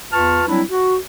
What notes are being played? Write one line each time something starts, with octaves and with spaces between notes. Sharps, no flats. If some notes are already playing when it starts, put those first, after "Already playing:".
E2 F4 B4 A5 C#6 F6
F#3 G3 C4 D4 E4
F#4